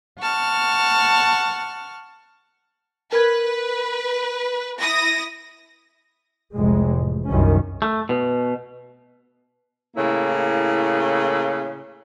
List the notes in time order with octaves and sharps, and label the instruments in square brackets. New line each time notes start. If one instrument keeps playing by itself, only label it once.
[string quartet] F#5 A5 C#6 F6
[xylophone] A#4 G#6 [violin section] B4
[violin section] E4 D#6 A#6
[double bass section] F1 C2 G#3
A1
C2 F#2 D#3 C#4
[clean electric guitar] A3
B2
[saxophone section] A2 C#3 A#3 E4